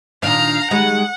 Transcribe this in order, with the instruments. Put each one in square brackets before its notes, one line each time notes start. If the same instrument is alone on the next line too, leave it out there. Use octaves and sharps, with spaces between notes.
[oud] A#2 D#3 D4 [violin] F5 A#5
[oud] D#3 G3 G#3 [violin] F#5